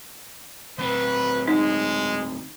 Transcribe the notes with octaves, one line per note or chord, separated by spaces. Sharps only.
D2 C4 B4
G#3 D#4